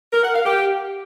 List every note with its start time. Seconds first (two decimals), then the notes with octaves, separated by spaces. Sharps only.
0.13 A#4
0.24 F#5
0.35 F5
0.45 G4